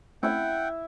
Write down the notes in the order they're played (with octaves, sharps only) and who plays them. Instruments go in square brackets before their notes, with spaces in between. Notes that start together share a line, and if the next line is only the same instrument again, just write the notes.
[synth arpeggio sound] A3 C4 C#4 [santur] E4 E5 [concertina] F#5 G5